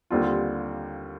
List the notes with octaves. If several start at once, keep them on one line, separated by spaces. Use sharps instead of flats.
D#2 D3 G3 C4 F4